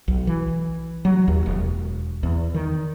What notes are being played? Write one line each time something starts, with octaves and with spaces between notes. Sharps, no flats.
B1
E3
F#3
D#2
E1
E2
D#3